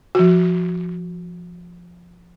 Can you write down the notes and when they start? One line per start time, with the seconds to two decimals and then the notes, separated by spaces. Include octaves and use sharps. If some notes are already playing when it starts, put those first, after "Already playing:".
0.15 F3 F#4